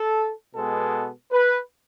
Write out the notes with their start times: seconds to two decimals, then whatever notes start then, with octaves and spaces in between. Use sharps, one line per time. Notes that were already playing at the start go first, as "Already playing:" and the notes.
Already playing: A4
0.55 B2 G#3 B3 A4
1.32 B4